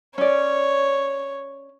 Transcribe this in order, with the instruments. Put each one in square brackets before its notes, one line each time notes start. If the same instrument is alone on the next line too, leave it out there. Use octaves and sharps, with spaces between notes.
[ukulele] C#4 D5 [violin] C#5